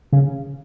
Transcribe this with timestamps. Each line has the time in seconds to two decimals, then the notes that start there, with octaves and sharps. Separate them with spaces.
0.12 C#3